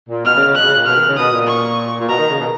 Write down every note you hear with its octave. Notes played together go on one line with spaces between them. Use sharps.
A#2
B2 F6
C#3
C#3
B2 F#6
C#3
A#2
B2 F6
D#3
C#3
B2 D#6
A#2
C#6
A#2
B2 A#5
D#3
C#3
B2